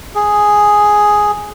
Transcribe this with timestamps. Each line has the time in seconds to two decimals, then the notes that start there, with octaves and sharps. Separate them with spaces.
0.15 G#4